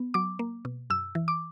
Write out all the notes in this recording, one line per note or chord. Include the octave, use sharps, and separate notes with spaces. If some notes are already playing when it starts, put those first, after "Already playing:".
Already playing: B3
F#3 D6
A#3
B2
F#2 E6
E3
D6